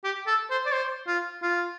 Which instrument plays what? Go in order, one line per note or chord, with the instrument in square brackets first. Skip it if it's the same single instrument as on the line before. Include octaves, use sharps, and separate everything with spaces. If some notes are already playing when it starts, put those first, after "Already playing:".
[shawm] G4
A4
C5
D5
C5
F4
F4